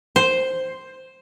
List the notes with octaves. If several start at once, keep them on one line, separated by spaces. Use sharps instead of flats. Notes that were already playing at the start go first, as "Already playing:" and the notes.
C5